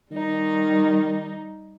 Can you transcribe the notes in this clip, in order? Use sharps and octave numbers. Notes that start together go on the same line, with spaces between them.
D#3 G3 D#4